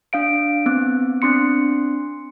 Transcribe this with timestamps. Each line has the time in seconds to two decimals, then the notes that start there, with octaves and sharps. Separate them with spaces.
0.13 D4 F5 D7
0.66 B3 C4
1.22 C4 D4 C6 C#7